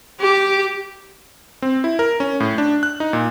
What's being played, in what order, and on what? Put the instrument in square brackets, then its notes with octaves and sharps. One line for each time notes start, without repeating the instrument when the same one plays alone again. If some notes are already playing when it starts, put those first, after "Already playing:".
[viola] G4
[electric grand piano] C4
E4
A#4
C#4
A2
D4
F#6
D#4
A#2